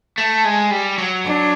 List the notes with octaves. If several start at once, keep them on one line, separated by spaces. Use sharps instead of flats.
A3
G#3
G3
F#3
D4